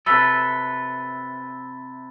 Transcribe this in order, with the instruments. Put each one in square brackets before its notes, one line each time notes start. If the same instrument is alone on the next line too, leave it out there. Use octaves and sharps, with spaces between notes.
[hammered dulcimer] C3 E5 [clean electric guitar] A4 B4 [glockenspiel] B5 A6 G7